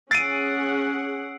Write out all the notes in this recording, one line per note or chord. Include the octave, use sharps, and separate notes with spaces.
C#4 G#4 F#5 E6 A6 C7 D7 D#7